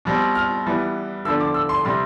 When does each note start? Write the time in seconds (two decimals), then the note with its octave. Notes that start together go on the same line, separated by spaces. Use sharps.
0.05 B2 G3 C4
0.35 F6
0.66 E3 G3 B3
1.25 D3 F3 B3 D4 E6
1.41 D6
1.54 E6
1.69 C6
1.85 C3 G3 C4 C6